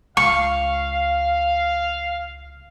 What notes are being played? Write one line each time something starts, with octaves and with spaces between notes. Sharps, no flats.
C#2 F5 C#6